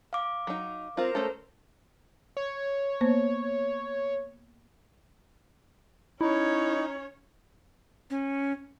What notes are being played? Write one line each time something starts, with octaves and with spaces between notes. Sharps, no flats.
F5 D6
F#3 D#4
C4 F4 A#4 C5 A#5
A3 C#4 A4
C#5
A#3 B3 C5
C#4 D#4 E4 C#5
C#4